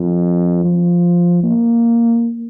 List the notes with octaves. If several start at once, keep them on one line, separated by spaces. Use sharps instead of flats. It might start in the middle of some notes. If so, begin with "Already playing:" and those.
Already playing: F2
F3
A#3